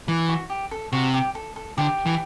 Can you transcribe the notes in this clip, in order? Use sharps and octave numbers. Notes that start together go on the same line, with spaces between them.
E3 B4
F#4
G4
A4
C3 F#4
G4
A4
A4
D3 G4
E3